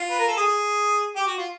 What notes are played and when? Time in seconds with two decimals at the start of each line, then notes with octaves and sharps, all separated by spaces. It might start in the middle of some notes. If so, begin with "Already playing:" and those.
Already playing: F4
0.10 B4
0.19 A#4
0.28 A4
0.37 G#4
1.16 G4
1.27 F#4
1.38 F4